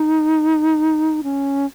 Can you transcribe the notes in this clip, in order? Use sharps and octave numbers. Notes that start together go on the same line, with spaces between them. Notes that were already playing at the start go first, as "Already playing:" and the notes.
Already playing: D#4
C#4